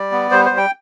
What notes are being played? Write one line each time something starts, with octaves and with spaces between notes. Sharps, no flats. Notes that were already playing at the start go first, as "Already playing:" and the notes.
Already playing: G3 D5
B3
G3 C5
C5
G3
G5